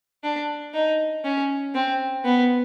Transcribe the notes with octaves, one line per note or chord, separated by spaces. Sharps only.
D4
D#4
C#4
C4
B3